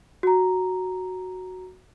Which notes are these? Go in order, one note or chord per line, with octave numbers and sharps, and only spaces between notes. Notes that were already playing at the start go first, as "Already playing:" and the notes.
F#4 A#5